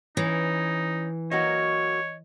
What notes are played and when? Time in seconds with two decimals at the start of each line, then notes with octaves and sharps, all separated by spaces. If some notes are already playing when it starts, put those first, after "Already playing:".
0.17 E3 C#4 D#4
1.31 F#3 A#3 F#4 C#5 D#5